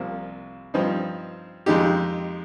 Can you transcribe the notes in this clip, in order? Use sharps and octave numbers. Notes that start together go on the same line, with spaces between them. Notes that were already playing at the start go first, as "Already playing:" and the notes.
Already playing: C2 C3 F3 A#3
G2 F3 C4 D#4
F2 D#3 G#3 D#4 G4